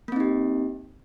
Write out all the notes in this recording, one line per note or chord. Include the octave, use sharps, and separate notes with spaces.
A#3 C4 D#4 G4